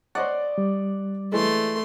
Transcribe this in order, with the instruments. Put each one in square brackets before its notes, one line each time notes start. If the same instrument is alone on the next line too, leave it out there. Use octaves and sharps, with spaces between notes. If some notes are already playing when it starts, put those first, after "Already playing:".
[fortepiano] C5 D#5 F#5 [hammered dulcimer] D5
[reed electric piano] G3
[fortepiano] E3 G#3 [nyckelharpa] A3 C6